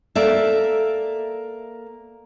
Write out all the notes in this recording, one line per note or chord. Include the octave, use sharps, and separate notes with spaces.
A#3 A4 D5 E5